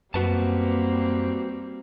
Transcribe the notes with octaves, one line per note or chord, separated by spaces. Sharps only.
F#2 G3 A#3 C4 F#4 B4 A5